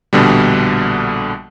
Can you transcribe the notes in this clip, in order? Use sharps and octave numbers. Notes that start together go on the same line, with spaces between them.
A#1 B2 D3 G3